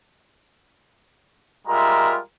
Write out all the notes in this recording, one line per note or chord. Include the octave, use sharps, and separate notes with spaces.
G3 G#3 F4 A#4 E5 A#5